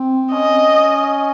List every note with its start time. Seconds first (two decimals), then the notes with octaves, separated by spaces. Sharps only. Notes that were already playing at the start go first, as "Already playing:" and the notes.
Already playing: C4
0.33 C#4 D#5